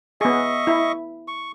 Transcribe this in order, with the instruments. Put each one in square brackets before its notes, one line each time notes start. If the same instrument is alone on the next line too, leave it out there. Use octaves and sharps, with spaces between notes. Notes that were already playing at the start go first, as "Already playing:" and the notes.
[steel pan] B3 G#4 [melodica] D#5 E5 C#6
[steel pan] E4
[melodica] C#6